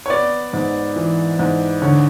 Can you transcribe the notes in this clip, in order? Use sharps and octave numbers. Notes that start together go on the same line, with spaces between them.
C#5
B3 D5
G#2
E3
G#2
D3 C#5